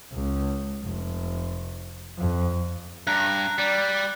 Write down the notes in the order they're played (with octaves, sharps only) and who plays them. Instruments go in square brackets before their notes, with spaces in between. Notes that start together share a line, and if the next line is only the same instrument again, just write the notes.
[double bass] C#2
F1
F2
[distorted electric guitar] G2 [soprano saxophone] A#5 [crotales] F#6
[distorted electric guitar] G3 [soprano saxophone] D5